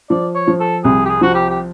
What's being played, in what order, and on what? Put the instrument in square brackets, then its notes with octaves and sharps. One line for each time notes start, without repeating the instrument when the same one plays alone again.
[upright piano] F3 [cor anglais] D5
[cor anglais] C#5
[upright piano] F3
[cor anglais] A4
[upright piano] C2 [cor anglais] G#4
[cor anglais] G4
G#4
[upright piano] F3 [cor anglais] F#4
[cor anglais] G4
G4